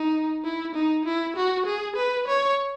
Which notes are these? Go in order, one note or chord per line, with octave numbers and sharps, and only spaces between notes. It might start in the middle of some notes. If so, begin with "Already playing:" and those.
Already playing: D#4
E4
D#4
E4
F#4
G#4
B4
C#5